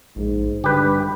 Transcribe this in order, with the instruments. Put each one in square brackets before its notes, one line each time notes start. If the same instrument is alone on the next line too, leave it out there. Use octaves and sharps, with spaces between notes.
[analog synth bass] A#1 [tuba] G#2
[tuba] G2 [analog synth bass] D3 [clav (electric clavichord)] G4 B4